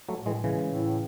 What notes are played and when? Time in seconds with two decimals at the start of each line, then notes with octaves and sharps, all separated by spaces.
0.09 F#3 A3
0.17 A2
0.26 E3 G#3
0.44 C#3 E3 G#3
0.70 A2